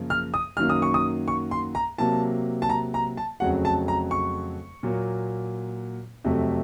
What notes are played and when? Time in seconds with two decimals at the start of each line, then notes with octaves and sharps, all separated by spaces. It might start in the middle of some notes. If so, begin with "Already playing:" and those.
Already playing: F#2 C#3 F3 A#3
0.10 F6
0.34 D#6
0.57 F#2 D#3 F#3 A#3 F6
0.70 D#6
0.82 C#6
0.94 D#6
1.28 C#6
1.51 C6
1.75 A#5
1.98 C3 F#3 A#3 A5
2.62 A5
2.69 A#5
2.94 A#5
3.17 A5
3.40 F2 C#3 F#3 A3 F#5
3.65 A5
3.88 A#5
4.11 C#6
4.83 A#2 F#3 A#3
6.24 F2 C3 F#3 A3